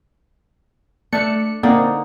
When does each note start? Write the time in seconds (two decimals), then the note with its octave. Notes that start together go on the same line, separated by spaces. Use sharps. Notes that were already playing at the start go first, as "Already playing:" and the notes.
1.13 A3 D4 E5 C#7
1.63 D3 A#3 C4 D#4 D5